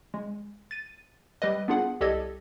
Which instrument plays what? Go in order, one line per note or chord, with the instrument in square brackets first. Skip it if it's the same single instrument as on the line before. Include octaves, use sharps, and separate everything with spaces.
[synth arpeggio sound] G#3
A6 D#7
G3 B4 D#5
B3 D4 F4 G#4 F#5
C2 G4 A4 D5 D#5 G#6